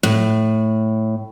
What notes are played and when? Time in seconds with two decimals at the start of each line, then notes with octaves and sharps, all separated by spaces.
0.03 A2